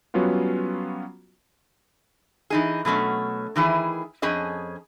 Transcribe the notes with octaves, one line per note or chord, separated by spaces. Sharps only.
F#3 G3 B3 C#4 F4 F#4
E3 D#4 G#4
B2 F#3 A3 C#4
D#3 E3 E4 G#4
F2 C#4 G#4 D#5